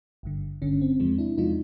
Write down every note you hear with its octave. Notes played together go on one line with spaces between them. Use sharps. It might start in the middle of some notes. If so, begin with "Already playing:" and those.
G#1 G2 D3
G#1 G2 D3 C#4
C4
E2 C3 F3 G#3 C4
D4 E4
E2 C3 F3 G#3 D#4 F4